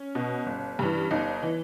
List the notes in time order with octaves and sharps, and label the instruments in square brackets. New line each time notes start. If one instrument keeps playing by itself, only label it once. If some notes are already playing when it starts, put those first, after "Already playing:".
Already playing: [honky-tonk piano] C#4
B2
G1
G2 E3
G1 D#4
E3